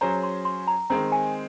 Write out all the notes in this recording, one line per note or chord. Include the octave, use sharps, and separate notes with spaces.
F#3 C#4 G#4 C5 A#5
C6
C6
A#5
D#3 G#3 C4 A#5
G#5